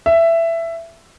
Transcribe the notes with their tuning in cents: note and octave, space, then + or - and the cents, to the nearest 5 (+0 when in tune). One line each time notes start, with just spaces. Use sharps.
E5 +15